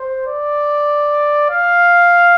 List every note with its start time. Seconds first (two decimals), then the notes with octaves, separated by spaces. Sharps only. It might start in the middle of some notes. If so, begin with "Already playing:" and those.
Already playing: C5
0.27 D5
1.51 F5